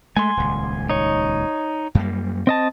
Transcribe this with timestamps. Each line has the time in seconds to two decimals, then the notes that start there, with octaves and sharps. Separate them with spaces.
0.17 G#3 A3 G#5 C6
0.37 D#1 C#2
0.90 D#4 C#5
1.95 F#2 G3 A#3
2.47 C4 D#5 A5